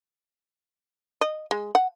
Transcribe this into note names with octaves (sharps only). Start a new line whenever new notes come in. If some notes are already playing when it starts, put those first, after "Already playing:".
D#5
G#3
F#5